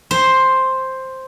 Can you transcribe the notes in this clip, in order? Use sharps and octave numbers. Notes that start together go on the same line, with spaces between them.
C5